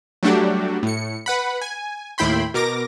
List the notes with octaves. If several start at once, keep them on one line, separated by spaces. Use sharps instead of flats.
F#3 G3 A3 D4 F#4 G4
A2 C#7
B4 F#5 B5
G#5
D#2 A2 E4 G5 B5 C6
B2 A#4 D6 A#6